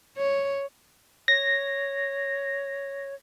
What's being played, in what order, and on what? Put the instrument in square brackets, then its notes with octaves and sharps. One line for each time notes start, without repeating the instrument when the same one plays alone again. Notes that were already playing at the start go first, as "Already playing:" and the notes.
[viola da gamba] C#5
[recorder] C#5 [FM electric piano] A#6